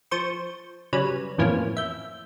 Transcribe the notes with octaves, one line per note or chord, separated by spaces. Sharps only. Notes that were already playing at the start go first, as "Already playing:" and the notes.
F3 C5 C#6
C#3 F#3 G3 C#4 B4
F2 A2 E3 F3 A#3 C#4
E5 G6